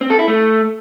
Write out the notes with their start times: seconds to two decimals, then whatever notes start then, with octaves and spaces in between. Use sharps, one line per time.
0.01 C4
0.10 A4
0.19 E4
0.28 A3